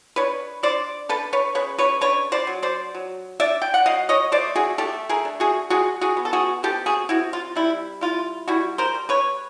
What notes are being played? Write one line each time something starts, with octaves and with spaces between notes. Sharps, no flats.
D4 B4 C#5
D4 C5 D5
D4 A4 B4
B4 C#5
C#3 B4 C#5
B4 C#5
D4 B4 C#5
C5 D5
F#3
C5 D5
F#3
D4 D5 E5
G5
F#5
F#3 D#5 F5
C#5 D#5
A3 C5 D5
F#4 G#4
A3 G4 A4
G#4 A#4
D4
F#4 G#4
G#3 F#4 G#4
F#4 G#4
B3
A4
F#4 G#4
C3 G4 A4
F#4 G#4
C3 E4 F#4
F4
G3 E4
E4 F4
G3 E4 F#4
A#4 C5
G3
B4 C#5